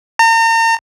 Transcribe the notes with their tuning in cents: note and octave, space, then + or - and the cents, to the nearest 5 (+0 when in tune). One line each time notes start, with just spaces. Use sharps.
A#5 -40